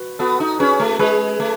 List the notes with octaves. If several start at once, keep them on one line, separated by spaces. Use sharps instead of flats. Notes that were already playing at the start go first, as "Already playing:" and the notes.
Already playing: F#4 B4
B3 F#4 A4
D#4
C#4 G#4 B4
A3
G#3 G#4 B4
A3